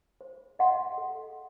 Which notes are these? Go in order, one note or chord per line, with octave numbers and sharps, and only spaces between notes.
C5
D#5 F#5 C6
A4